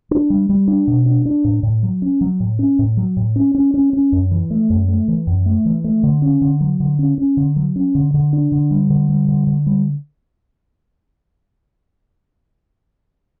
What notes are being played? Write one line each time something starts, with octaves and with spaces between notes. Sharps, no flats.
D4
G3
G3
D4
B2
D4
D4
A2
A2
F#3
C#4
F#3
A2
C#4
A2
F#3
A2
C#4
C#4
C#4
C#4
F#2
E3
A3
F#2
A3
E3
F#2
A3
E3
A3
D3
C#4
D3
F#3
D3
C#4
C#4
D3
F#3
C#4
D3
D3
D4
D3
G3
D3
G3
D3
D3
G3